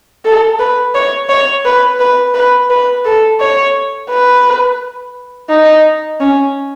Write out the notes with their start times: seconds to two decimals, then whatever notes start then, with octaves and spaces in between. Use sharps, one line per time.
0.25 A4
0.59 B4
0.95 C#5
1.29 C#5
1.65 B4
2.00 B4
2.34 B4
2.70 B4
3.05 A4
3.40 C#5
4.10 B4
5.49 D#4
6.20 C#4